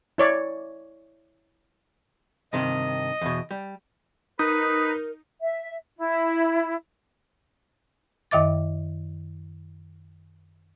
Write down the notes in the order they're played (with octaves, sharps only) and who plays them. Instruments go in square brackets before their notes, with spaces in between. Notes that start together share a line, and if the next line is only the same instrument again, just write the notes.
[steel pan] E4 C#5 D5
[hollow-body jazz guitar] G2 C3 D#3 [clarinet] D#5
[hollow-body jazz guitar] E2 B2
G3
[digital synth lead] D#4 [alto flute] A#4 [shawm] B4 [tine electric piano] D#6
[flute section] E5
E4
[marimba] F#2 D#3 D#5 E5 D6 A6